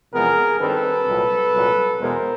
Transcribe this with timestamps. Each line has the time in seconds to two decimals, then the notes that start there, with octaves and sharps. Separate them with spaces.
0.13 E2 C3 F3 G#3 B3 G#4 A#4
0.60 G2 D#3 G3 C4 A4 B4
1.07 C2 A#2 F#3
1.53 C2 A#2 F#3
2.00 E2 B2 G#3 A#4 C5